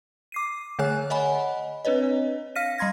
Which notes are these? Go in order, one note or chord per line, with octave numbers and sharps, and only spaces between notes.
D6 C7 D#7
D3 A3 G#4 C#5 G#5 F#6
C#5 D#5 F#5 G#5 B5
C4 D4 B4 C#5 D#5
F5 F6 A#6 B6 D#7
G3 A#5 C6 G#6 A#6